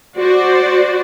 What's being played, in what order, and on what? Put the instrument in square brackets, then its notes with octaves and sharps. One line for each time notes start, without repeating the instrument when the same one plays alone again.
[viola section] F#4 C5 D5